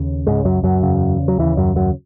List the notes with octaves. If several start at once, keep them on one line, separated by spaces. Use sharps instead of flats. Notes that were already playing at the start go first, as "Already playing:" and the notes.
Already playing: D#2 C#3
C#2 G#2 C#3 G#3
F#2 F#3
F#2 F#3
E2 C#3
F#3
D#2 C#3 E3
F#2 F#3
F#2 F#3